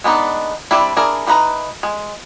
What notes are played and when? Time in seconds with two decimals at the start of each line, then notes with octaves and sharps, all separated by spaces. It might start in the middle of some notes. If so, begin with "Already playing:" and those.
0.04 G#3 B3 D4 D#4
0.71 G3 C4 D4 E4
0.96 D4 E4 G#4 A#4
1.26 E3 G3 D#4 B4 A#5
1.83 G#3